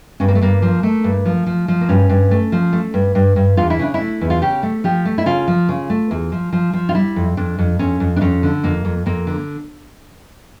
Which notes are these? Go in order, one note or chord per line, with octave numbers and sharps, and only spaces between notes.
G2 C#4
A#3
A3
G2 A#3
F3
A3
G2
F3
F3
F3
A#3
G2 C#4
G2
A3
F3
A3
G2
G2
G2
E2 F4
E4
C#3 D4
E4
A3
E2
F4
C#3 G4
A3
F3 G4
A3
E4
C#3 F4
F3
C#3
A3
E2
F3
F3
F3
F4
G3 E4
F2
F2 D4
F2
F2 C#4
F2
D4
F2 C#4
D3
F2 A#3
F2
F2 A#3
D3